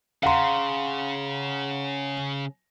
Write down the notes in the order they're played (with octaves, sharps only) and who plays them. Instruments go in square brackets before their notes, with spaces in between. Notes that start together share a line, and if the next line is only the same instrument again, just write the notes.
[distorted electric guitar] C#3 [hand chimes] F5 C6 [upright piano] F#5 A#5